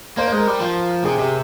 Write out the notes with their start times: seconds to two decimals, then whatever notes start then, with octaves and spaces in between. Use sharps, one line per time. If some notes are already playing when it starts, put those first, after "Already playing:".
0.17 A#3 C5
0.28 C5
0.32 G#3
0.37 A#4
0.47 G3
0.60 F3
1.04 C3 G#4
1.18 C3 G4